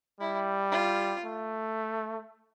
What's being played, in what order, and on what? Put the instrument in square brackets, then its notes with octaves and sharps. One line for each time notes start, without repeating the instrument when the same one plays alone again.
[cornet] G3 [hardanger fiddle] E4
[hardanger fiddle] F4
[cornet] A3